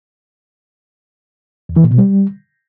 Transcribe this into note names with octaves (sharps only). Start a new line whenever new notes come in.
E2
E3
A#2
B2
G3